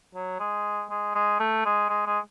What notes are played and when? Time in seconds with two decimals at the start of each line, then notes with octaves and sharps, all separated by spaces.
0.15 F#3
0.40 G#3
0.90 G#3
1.15 G#3
1.39 A3
1.65 G#3
1.89 G#3
2.06 G#3